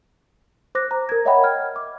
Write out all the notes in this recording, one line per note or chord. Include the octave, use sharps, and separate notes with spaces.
C5 D6 F#6 A#6
A#5
A#4 G#6
C#5 D#5 E5 F#5 G5 B5
F6 G#6
D6